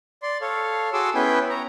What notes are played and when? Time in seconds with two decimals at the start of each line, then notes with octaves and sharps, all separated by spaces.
0.23 D5 C6
0.42 A4 C#5 F5
0.93 F#4 G#4 A4 C6 D6 E6
1.15 B3 C#4 E4 B4 G5 G#5
1.50 C#5 A#5